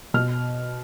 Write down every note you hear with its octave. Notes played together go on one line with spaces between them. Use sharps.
B2 F6